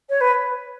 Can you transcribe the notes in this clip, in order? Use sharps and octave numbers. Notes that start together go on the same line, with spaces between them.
C#5
B4